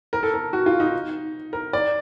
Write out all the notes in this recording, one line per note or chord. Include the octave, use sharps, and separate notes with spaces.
A#4
A4
A#4
F#4
F4
D#4
A#4
D5